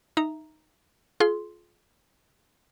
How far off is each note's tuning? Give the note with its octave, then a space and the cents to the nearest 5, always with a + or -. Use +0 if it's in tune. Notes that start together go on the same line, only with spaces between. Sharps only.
D#4 +0 E5 -5 A#5 +0
F4 +0 G#4 +35 C6 +0